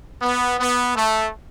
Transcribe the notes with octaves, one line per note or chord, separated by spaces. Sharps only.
B3
B3
A3